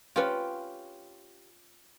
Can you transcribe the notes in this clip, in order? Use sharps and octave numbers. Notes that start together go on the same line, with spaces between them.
C#4 F4 G4 B4